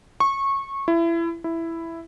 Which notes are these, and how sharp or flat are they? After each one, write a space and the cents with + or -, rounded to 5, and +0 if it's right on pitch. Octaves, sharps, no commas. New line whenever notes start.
C#6 -20
E4 +25
E4 +5